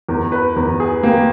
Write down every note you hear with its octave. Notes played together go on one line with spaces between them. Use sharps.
E2 A#4
B4
E2 A#4
G#4
A#3 G4